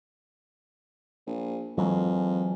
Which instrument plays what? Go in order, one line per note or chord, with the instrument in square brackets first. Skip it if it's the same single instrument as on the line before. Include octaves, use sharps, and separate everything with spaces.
[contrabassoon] A#1
[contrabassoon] F2 [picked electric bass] E3 F#3 G#3